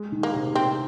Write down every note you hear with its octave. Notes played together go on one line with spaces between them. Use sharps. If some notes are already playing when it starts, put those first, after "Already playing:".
Already playing: G#3
D#3
A#3
C3
C3 C4